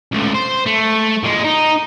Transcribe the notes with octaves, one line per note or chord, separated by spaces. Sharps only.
C#2 A3
C5
A3
A#2 G#3
D#4